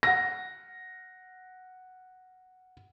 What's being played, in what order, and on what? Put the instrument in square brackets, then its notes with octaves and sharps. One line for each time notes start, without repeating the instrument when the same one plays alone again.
[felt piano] F#5 A#6